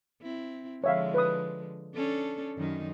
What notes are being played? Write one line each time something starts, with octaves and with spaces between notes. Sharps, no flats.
C4 E4
D3 F3 G#3 C#5 E5 F5
B4 D#6
C#4 D4 A4
F#2 D#3 D#4